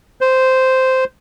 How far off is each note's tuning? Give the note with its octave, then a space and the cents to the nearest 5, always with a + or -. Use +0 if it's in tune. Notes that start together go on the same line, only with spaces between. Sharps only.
C5 -10